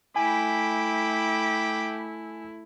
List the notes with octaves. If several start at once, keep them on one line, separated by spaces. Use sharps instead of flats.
A3 E4 G5 G#5 B5 D6